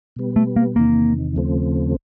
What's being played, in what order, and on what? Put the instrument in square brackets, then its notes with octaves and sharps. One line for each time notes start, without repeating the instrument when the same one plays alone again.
[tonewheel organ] B2 G3 B3
[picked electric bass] A3
A#3
[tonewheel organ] E2 C3 D#3 [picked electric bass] A#3
[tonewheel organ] D#2 C#3 F3 A3 C4